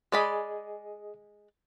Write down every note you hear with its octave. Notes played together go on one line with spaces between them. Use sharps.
G#3 G#4 D5 D#5 B5